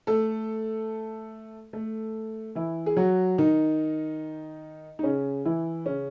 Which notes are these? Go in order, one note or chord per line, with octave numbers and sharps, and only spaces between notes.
A3 A4
A3 A4
E3 E4
G#4
F#3 F#4
D#3 D#4
D#4
C#3 C#4
E3 E4
C#3 C#4